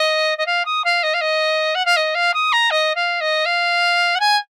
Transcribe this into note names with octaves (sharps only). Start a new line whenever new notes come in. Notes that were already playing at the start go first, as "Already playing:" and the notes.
Already playing: D#5
D#5
F5
D#6
F5
D#5
F5
D#5
F#5
F5
D#5
F5
D#6
A#5
D#5
F5
D#5
F5
F#5
G#5